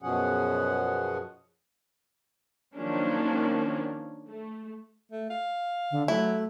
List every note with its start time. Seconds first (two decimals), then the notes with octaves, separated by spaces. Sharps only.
0.02 F#2 B2 F3 C#4 G#4 F#5
2.76 D#3 F3 F#3 A#3 C#4 D4
4.28 A3
5.12 A3
5.30 F5
5.91 D3
6.08 F#3 A3 E4